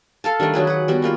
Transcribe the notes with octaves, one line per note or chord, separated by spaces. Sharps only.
A4 F5 A5
D#3 G3 A3 D4
D#3 F#3 G#4 B4
B4 F#5
G3 B3 F#4
G#3 A#3 F4 G4